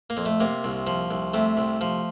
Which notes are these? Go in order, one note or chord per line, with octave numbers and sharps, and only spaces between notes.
A#3
F2
A3
C3 A#3
C2
F3
C2
C3 A3
C2
F3